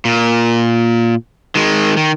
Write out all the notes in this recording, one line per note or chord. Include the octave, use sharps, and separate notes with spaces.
A#2
D#3 G#3
D#3